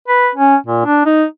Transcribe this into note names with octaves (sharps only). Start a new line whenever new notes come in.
B4
C#4
A#2
D4
D#4